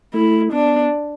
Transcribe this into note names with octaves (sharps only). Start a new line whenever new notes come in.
A3 E4
B3 D4